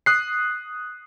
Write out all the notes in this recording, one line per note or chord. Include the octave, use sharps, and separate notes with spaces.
D#6 F#6 C7